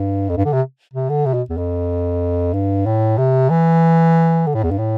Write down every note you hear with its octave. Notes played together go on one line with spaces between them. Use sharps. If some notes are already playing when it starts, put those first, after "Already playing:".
Already playing: G2
F2
G2
D3
C3
C3
D3
C3
B2
E2
F2
G2
A2
C3
E3
D3
A2
E2
G2
A2